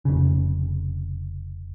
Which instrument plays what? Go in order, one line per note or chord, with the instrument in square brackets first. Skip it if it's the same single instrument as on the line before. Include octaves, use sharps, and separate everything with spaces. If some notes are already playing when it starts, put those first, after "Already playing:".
[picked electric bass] F1 C#3